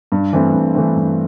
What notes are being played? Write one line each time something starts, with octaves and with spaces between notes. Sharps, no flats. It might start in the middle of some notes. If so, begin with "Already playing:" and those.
G2
E3 A3 C4
G2
E3 A3 C4
G2